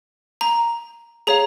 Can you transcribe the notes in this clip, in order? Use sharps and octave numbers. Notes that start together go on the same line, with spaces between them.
A#5
G#4 C#5 F5 A#5